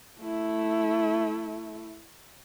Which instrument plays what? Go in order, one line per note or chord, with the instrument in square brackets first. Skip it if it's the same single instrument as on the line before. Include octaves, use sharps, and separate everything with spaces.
[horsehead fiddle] A3 E4